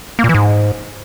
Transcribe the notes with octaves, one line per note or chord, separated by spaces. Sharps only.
A#3
A#2
E3
G#2